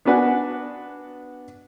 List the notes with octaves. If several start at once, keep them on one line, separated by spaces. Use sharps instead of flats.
B3 D4 F#4 B4 F#5 G#5